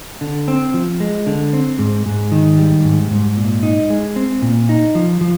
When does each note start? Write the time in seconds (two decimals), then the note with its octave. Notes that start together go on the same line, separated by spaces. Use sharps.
0.21 D3
0.48 C4
0.74 F3
1.00 G#3
1.27 D3
1.53 C4
1.79 G#2
2.06 G#2
2.32 D#3
2.58 G3
2.85 G#2
3.11 G#2
3.37 A#2
3.63 D#4
3.90 G#3
4.16 C4
4.42 A#2
4.69 D#4
4.95 F3
5.21 F3